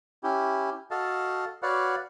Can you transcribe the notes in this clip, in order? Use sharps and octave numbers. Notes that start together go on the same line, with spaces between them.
C#4 E4 G4
F#4 A4 D#5 F5 A5
F#4 B4 C#5 D5 F5 F#5